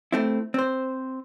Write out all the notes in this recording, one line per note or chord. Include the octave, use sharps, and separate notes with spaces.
A3 C4 E4
C4 C5